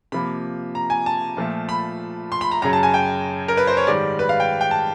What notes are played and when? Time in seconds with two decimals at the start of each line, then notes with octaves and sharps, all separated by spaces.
0.12 C3 F3 A#3 B5
0.75 A#5
0.90 G#5
1.06 A5
1.37 A#2 F3 A3
1.69 B5
2.32 C6
2.41 B5
2.51 A#5
2.62 F#2 C#3 F#3 A#5
2.73 A5
2.83 G#5
2.94 G5
3.48 A#4
3.57 B4
3.67 C5
3.77 C#5
3.87 G#2 D#3 G3 D5
4.19 B4
4.29 F5
4.40 G5
4.61 G5
4.71 A5